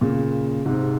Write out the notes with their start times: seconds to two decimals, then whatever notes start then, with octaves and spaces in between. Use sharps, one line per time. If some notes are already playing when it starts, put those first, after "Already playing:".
0.01 A#2 C#3
0.66 G#2 C3